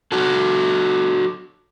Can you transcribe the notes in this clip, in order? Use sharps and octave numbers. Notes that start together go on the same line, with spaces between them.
F#3 F#4 A4